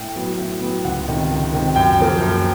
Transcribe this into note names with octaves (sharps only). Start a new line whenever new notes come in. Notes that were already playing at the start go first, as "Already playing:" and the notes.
Already playing: A2 G5
F#3 B3
A2
F#3 B3
C#2 F#5
C3 D#3
C#2
C3 D#3
F#2 G5
C#3 F3 A#3
F#2